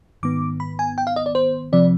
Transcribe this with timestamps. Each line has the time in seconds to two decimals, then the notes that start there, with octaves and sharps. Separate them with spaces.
0.23 G#2 D#3 B3 D6
0.60 B5
0.79 G#5
0.98 G5
1.07 F5
1.16 D#5
1.26 D5
1.35 C5
1.73 C3 F3 C4 D5